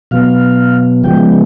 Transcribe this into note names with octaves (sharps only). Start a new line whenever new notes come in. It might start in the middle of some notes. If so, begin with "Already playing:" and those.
B2 F#3 B3 F5
C#3 F3 G#3 B3 G5